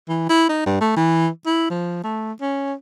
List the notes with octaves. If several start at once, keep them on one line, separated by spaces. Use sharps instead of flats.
E3
E4
D#4
G2
A3
E3
E4
F3
A3
C#4